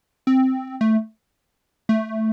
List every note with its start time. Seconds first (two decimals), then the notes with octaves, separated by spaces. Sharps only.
0.27 C4
0.81 A3
1.89 A3